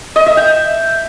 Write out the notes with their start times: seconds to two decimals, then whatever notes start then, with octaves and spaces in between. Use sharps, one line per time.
0.16 D#5
0.26 E5
0.37 G5